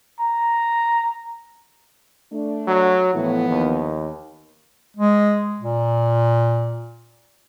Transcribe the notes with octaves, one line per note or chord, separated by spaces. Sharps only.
A#5
A3 D4
F#3
A2 E3 F3 B3
D#2
G#3
A#2